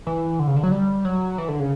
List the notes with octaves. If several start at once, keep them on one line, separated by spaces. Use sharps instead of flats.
E3
D3
C#3
D3
F#3
G3
F#3
E3
D3
C#3